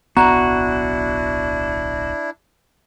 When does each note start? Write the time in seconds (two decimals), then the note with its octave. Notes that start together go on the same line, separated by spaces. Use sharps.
0.17 D1 B1 B3 D4 E4 F#4 A#5